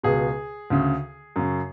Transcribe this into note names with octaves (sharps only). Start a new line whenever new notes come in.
C#2 B2 G#4
D2 C#3
F#2 C#3